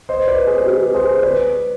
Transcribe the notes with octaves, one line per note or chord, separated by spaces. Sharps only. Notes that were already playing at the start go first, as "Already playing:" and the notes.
C5 D#5
B4 D5
G#4 C5
G4 B4
G#4 C5
C5
B4 D5